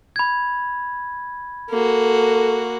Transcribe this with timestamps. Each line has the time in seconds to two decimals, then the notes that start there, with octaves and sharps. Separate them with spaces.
0.16 B5 G#6
1.70 A#3 F#4 A4